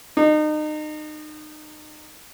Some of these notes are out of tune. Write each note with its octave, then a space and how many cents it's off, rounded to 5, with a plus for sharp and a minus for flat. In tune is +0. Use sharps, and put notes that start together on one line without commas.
D#4 -30